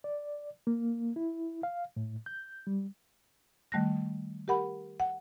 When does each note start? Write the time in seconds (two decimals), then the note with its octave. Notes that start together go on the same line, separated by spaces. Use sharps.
0.04 D5
0.67 A#3
1.16 E4
1.63 F5
1.97 A2
2.26 G6
2.67 G3
3.72 D#3 G3 A3 F#6 A#6
4.48 G4 A#4 F#5 B5
5.00 F#5